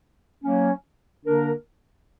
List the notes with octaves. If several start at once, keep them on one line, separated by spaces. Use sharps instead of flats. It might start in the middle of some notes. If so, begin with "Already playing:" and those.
F#3 A#3 C#4
D3 A#3 D4 A#4